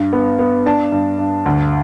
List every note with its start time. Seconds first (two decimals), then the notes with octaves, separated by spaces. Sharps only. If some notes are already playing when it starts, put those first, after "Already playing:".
Already playing: G2
0.13 B3
0.39 B3
0.66 D4 A5
0.92 G2
1.19 G2
1.46 D2